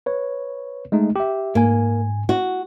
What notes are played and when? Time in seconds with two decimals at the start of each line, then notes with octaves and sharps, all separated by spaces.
0.06 B4 C#5
0.92 G#3 A3 D#4
1.16 G4 E5
1.55 G#2 A#3 G#5
2.29 F#4